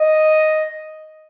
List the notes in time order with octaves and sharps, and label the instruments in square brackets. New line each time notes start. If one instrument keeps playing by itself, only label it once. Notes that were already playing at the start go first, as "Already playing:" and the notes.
Already playing: [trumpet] D#5